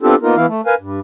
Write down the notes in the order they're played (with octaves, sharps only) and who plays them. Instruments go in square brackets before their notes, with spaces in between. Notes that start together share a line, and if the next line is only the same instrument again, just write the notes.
[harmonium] B3 C4 D4 F4 G4 A4
A#3 B3 D#4 F4 A#4
E3 B3 E4 F5
A3
A#4 B4 F5 G#5
G2